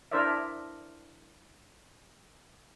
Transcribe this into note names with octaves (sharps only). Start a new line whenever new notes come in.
D4 E4 A#4 C5 D5 E5